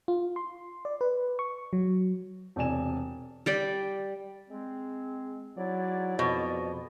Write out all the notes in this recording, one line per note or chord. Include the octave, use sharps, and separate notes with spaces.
F4
C6
D5
B4
C#6
F#3
E1 C3 D5 G#5 E7
G3 D5 G5
G#3 C4
G#2 F#3 E4 D5
F2 B2